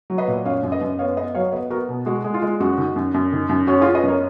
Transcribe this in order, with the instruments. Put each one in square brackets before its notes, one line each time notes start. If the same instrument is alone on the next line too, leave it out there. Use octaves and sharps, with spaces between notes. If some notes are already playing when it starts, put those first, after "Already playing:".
[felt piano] F#3
B4 D#5
A#2
F#2 C#5 F5
F#2
B4 D#5
F#2
B3 C#5 F5
B3 B4 D#5
F#3 C#5 F5
B3 B4 D#5
B3 F#4 A#4
B2
G#3 F#4
G#3
F4
G#3
F#2 F#4
D#3
F#2
F#2
D#3
F#2
C#4 F#4
F4 G#4
C#4
B4 D#5
F#2 A#4 C#5